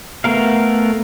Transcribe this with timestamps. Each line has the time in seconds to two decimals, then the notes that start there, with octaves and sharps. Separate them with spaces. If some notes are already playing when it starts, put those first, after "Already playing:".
0.24 A3 B3 A#4 F5